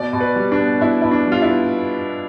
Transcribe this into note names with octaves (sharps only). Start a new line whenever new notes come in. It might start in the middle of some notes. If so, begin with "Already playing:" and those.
Already playing: B2 D5
B2
B4
G3
D4
B3
B2 E4
B2 E4
D4
G3
F4
E4
B3